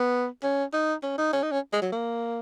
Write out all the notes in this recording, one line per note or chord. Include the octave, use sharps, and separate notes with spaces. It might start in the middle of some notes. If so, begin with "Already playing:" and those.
Already playing: B3
C#4
D#4
C#4
D#4
C#4
D#4
C#4
G#3
F#3
A#3